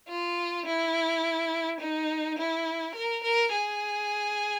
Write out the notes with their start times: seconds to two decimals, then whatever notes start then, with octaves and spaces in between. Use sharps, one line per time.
0.08 F4
0.66 E4
1.80 D#4
2.38 E4
2.95 A#4
3.23 A#4
3.52 G#4